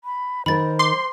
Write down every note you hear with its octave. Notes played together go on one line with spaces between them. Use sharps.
B5
D#3 A#4 C5 B5 A6
C6 D6